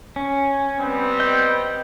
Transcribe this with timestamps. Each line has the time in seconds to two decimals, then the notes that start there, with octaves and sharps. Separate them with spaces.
0.16 C#4
0.80 G3 B3 C4
1.20 D#5 G6